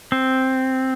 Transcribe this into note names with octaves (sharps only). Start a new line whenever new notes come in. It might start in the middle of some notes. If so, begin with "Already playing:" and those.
C4